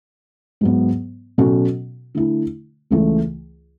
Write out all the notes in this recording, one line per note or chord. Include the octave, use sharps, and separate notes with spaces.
G#2 F#3 B3
B2 F#3 C#4 F#4 A4
D3 A3 E4
C#2 C#3 E3 A3